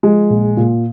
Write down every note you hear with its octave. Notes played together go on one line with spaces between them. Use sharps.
F3 G#3
A#1
A#2